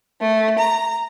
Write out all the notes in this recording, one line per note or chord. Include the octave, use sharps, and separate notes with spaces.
A3
A#5